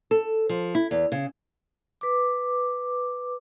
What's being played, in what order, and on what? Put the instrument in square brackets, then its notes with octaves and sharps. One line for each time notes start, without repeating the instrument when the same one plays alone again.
[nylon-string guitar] A4
F3
E4
E2
C#3
[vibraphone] B4 D6